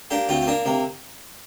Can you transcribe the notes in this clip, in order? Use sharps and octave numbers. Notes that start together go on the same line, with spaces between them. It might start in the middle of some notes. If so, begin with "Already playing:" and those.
A#3 D4 G4
D2 C4 F4
C4
A#3 D4
C3 A#3